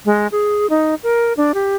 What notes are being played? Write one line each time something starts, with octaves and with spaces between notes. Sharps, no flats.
G#3
G#4
D#4
A#4
D4
G4